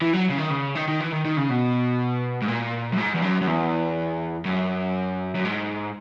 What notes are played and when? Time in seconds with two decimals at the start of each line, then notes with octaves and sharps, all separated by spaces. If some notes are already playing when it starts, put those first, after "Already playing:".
0.02 E3
0.13 F#3
0.29 C#3
0.38 D#3
0.50 C#3
0.75 D#3
0.88 D#3
1.00 E3
1.13 D#3
1.25 D#3
1.37 C#3
1.49 B2
2.42 G#2
2.48 A#2
2.93 F#2
2.98 G#2
3.15 E2
3.22 F#2
3.41 F#2
3.47 E2
4.45 F#2
5.35 F#2
5.45 G#2